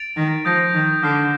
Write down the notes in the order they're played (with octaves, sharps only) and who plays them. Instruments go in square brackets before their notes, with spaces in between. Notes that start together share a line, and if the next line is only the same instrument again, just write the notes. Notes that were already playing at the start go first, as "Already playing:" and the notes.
Already playing: [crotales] A6 D7 F7
[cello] D#3
[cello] F3 [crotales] D#6 G6 A#6
[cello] D#3
[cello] D3 [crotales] D6 F6 C7